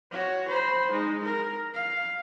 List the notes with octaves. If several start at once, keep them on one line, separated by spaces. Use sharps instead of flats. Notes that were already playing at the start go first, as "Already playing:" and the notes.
F#4 C#5
C5 B5
G#3 D#4
A#4
F5